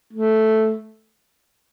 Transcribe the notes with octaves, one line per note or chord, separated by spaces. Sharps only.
A3